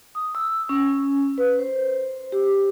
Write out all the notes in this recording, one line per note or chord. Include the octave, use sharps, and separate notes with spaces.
D#6
E6
C#4
B4
C5
G4